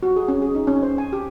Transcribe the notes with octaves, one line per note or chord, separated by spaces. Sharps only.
F#4
G#4
C#4
G#4
D#4
C#4
C5
G#5
G4